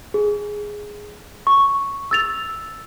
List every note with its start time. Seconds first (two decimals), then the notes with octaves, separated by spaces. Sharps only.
0.14 G#4
1.47 C#6
2.11 E6 A6 F7